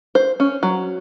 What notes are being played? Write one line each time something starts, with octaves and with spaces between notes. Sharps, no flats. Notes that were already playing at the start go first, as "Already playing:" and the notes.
C5
C#4
F#3